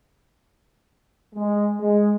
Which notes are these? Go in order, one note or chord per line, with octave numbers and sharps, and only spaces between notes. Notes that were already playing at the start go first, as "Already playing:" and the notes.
G#3
G#3